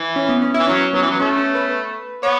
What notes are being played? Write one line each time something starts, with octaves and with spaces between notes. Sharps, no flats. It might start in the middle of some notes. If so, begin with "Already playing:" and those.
Already playing: E3 E4
C#4
B3
C#4
E3 E4
F#3 C#4
F#3 B3
E3
F#3
A3 C#4
C#4
B4
B3 C#5